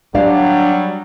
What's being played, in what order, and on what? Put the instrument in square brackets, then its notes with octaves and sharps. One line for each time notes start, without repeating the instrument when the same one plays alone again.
[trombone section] F#3 G3 [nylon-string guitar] D4 D5 F5